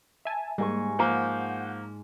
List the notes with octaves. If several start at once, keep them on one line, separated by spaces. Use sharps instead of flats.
E5 G#5 A5
G#2 G3 A#3 G#5 C#6
F3 A#3 F#5 G6